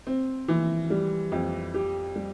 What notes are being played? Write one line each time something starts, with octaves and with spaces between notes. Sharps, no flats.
C4
E3
G3
F2
G4
G3